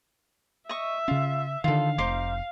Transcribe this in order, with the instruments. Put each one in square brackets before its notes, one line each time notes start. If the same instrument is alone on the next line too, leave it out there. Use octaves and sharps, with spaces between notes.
[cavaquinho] D#5 C#6 [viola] E5
[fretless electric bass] C#3 C#4 [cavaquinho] F4
[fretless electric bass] D3 D#3 [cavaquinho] F4 A4 [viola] F5
[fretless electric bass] F1 [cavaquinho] D#4 C5 D6